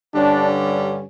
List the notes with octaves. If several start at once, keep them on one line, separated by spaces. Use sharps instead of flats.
G2 D3 G3 C#4 D4